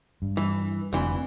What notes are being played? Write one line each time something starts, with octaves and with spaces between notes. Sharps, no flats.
G2
E3
F1 D2 E3 C4